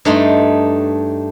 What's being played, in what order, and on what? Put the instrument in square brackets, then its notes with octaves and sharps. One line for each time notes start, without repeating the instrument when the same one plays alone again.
[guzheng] G2 A3 D#4 C6